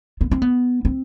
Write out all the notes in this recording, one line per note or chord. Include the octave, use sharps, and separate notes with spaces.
B3
C4
B3
C4